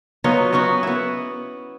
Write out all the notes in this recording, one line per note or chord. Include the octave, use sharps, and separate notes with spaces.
F#3 B3 D#4 F4
B3 C#4 D#4 F#4
B3 E4